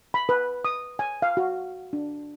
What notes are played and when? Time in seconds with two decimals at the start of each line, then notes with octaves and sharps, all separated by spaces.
0.14 B5
0.29 B4
0.65 D#6
0.99 G#5
1.22 F5
1.37 F#4
1.93 D4